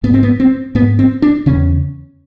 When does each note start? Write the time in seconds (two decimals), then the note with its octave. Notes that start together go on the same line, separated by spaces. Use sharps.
0.03 G#2 B3
0.14 C4
0.23 B3
0.40 C4
0.75 G#2 B3
0.99 C4
1.22 D4
1.46 E2 C#3 C#4